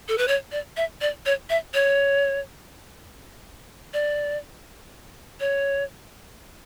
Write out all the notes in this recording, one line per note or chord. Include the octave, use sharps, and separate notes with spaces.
A4
B4
C#5
D5
E5
D5
C#5
E5
C#5
D5
C#5